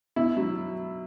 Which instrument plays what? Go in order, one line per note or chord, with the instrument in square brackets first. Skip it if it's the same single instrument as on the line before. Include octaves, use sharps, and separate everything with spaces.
[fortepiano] B2 E4
F#3